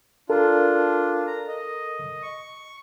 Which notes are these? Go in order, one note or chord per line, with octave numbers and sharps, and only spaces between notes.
D4 F4 A4 A#4
A#5
D#5
C#6